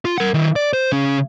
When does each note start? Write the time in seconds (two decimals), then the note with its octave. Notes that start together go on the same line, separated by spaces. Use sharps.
0.05 F4
0.18 A#4 F#5
0.34 D#3 E4
0.56 D5
0.73 C5
0.92 C#3 C#4